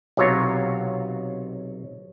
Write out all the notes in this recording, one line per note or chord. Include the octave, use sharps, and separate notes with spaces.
B1 C3 F#3 F4 C#5 A#5